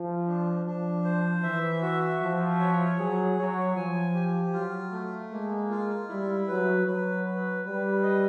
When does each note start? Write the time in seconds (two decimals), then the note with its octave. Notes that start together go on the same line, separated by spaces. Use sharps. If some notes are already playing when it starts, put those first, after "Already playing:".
Already playing: F3
0.27 D4
0.65 F3 D4
1.04 C5
1.43 E3 E5
1.82 F#4
2.21 F3 E5
2.60 C#5
2.99 F#3 G#4
3.38 F#3 C#5
3.76 F3 G#5
4.14 G4
4.53 F#3 F4
4.92 A3
5.31 G#3 A#3
5.70 F4
6.09 G3 E4
6.48 F#3 B4
6.86 F#3 B4
7.25 B4
7.65 G3 B4
8.03 D#5